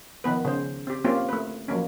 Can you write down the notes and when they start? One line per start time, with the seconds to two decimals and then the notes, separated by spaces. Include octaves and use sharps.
0.24 D#3 F3 B3 B4
0.45 C#3 C5
0.87 C4 G4
1.04 A#3 C4 C#4 F4 G4
1.29 A3 B4
1.68 F3 F#3 A#3 C#4